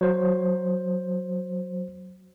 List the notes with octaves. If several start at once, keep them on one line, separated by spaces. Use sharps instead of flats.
F#3 C5